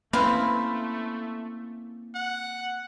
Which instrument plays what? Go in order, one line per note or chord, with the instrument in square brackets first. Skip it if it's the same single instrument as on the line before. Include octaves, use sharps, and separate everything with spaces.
[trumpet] A3 [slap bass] A#3 C#4 [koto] C4 E4 [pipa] B4 F5
[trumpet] F#5